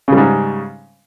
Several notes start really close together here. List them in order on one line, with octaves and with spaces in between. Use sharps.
C#3 G3 G#2